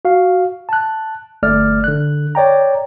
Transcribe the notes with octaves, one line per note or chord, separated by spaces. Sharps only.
F#4 F5
A5 F#6
G1 A3 D5 F6
D3 F#6
C#5 D5 G5 A#5